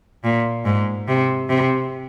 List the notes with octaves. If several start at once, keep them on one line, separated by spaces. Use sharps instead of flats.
A#2
G#2
C3
C3